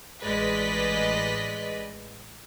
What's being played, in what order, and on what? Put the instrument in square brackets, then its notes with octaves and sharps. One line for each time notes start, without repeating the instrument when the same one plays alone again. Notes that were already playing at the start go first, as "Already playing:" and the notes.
[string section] A1 G#3 B4 D5 D#5 B6